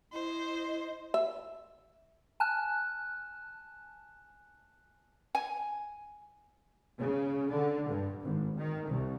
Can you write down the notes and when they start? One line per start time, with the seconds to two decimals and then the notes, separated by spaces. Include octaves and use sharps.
0.13 E4 C5 D#5
1.14 E5
2.40 G#5 A5 F6 F#6
5.35 G#5
7.00 C#3
7.51 D3
7.89 G2
8.23 G#1
8.58 D#3
8.88 C2